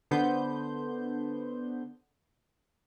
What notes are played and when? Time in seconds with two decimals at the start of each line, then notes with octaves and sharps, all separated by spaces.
0.11 D3 B3 C5 G6